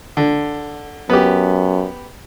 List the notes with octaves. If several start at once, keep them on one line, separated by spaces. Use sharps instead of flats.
D3
F#2 B3 G4